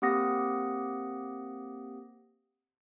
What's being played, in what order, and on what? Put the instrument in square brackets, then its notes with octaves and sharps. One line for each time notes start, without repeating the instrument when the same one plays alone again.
[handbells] A#3 C4 G4 F#5 D#6 A#6